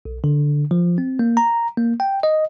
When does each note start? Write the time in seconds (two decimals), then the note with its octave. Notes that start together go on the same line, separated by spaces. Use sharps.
0.05 B1
0.24 D3
0.71 F3
0.98 C4
1.19 A#3
1.37 A#5
1.77 A#3
2.00 G5
2.23 D#5